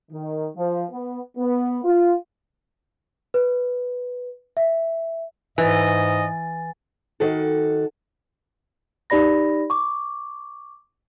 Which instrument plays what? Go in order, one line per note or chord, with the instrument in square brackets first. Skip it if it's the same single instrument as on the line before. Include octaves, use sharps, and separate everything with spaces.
[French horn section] D#3
F3
B3
B3
F4
[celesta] B4
E5
[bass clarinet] G#2 [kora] E3 [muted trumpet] D#5 [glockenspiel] G#5 A6
[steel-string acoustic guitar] D#3 F#4 A4
[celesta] D#4 G4 D5 B5 A#6
C#6 D6